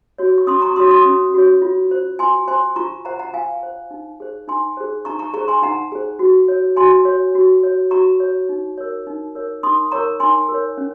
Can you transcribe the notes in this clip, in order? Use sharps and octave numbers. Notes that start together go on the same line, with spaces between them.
F#4 C#5
C#6
C#4 C6 D#6
A#5 C#6
F#4 C#5 C6 D#6
C6 D#6
C#4
F#4 C#5
F4
C5
F4 G#5 C6
C5 G#5 C6
F4 A#5 C#6
C5 F#5 A#5
F#5 A#5
F4 F5 G#5
C5
D#4
G#4 C5
D#4 G#5 C6
G#4 C5
D#4 A#5 C#6
A#5 C#6
G#4 C5 A#5 C#6
G#5 C6
D#4 F#5 A#5
G#4 C5
F#4
C#5
F#4 G#5 C6
C#5
F#4
C#5
F#4 A#5 C#6
C#5
D#4
A#4 C#5
D#4
A#4 C#5
D#4 C6 D#6
A#4 C#5 A#5 C#6
D#4 G#5 C6
A#4
C#5
C#4